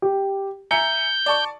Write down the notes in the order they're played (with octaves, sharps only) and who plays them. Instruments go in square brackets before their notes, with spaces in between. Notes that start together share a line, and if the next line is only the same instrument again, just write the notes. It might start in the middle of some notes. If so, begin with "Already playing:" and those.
[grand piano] G4
[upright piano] E5 G#5 A#5 [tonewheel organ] G6 [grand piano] C#7
[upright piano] D5 A5 C#6